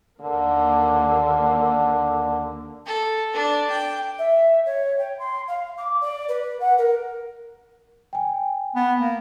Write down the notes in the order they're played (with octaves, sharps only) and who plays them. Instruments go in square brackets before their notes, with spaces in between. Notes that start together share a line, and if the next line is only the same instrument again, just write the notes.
[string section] D#2 A#3 [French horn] D3
[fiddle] A4
D4
G5
[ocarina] E5
C#5
G5
C6
F5
D6
D5
B4
F#5
A#4
[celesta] G5 G#5
[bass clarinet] B3
A#3